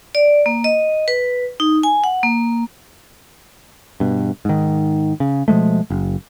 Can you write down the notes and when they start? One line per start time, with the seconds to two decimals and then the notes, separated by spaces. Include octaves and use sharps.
0.15 D5
0.46 A#3
0.64 D#5
1.08 B4
1.60 D#4
1.83 G#5
2.04 F#5
2.23 A#3
4.00 G2 B2
4.45 G#2 D#3
5.20 C#3
5.48 B2 F3 G#3 A3
5.90 F#1